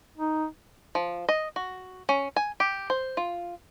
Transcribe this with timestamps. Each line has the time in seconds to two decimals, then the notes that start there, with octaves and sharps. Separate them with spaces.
0.18 D#4
0.95 F3
1.29 D#5
1.56 F#4
2.09 C#4
2.36 G#5
2.60 G4
2.90 C5
3.17 F4